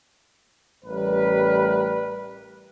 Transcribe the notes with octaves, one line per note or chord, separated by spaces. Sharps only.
A1 G3 A#4 B4